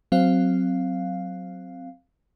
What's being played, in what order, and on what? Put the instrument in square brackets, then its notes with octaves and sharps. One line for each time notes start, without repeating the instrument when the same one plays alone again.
[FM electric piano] F#3 C4 F5